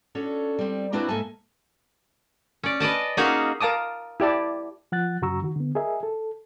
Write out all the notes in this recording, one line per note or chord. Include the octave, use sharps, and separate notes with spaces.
C#4 D4 F#4 A4
G3 C4
A#3 C4 D4 E4 F#4 B4
G#2 A#3 A4 E5 G#5 A5
C#4 D5
B4 D5 D#5 A5
A#3 C#4 D#4 F#4 G#4 F5
A#4 F5 A5 D6 D#6
E4 G4 D5 A5
F3 F#5 F#6 A6
F#2 C#3 F#4 A#5 C#6 E6
D#3 F#4
D3 B3
G#4 A#4 D#5 E5 G#5
A4